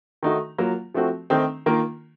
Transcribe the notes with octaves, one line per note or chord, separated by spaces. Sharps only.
D#3 A3 D#4 F#4
F#3 A#3 F4
F3 A3 C4 F#4
D#3 A3 C4 D#4
D#3 A#3 F4